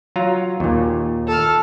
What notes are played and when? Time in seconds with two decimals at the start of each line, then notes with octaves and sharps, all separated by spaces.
0.16 F#3 F4 A#5
0.60 D#2 A#2
1.28 A4 F6